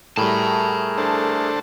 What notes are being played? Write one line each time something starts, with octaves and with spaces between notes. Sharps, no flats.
A2 G3 A3 G#4 A#4 A5 B5
D4 A4 C5